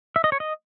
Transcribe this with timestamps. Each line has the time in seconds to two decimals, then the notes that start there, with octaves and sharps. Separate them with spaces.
0.16 E5
0.24 D#5
0.32 C#5
0.40 D#5